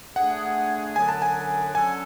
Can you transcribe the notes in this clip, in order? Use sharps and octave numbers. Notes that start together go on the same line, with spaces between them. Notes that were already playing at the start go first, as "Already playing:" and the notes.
D3 A3 D4 G#4 F#5
F#2 D3 F#3 B3 D4 G#5
A5
G#5
D3 F#3 C#4 F#4 A4 G#5